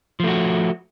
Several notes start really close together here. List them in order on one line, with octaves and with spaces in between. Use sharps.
F3 A3 F#4